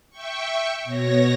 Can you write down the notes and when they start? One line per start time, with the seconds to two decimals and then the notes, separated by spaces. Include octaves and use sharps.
0.10 E5 G5 C#6
0.84 B2 C#5 A#6